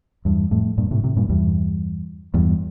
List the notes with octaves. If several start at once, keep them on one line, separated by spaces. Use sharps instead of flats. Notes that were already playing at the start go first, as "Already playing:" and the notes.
E2 G2
F2 A2
G2 A#2
A2 C3
A2 C3
G2 A#2
E2 G2
E2 G2